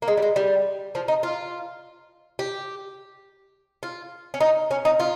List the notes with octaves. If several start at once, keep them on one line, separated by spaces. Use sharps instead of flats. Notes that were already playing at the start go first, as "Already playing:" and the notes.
A#3
G#3
G3
G#3
G3
F3
D#4
F4
G4
F4
C#4
D#4
C#4
D#4
F4